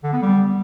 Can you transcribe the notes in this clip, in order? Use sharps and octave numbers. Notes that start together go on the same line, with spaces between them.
D3
B3
G3